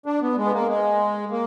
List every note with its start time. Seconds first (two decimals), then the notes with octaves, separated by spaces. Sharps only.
0.06 D4
0.22 B3
0.37 G#3
0.45 B3
0.53 A#3
0.68 G#3
1.31 A#3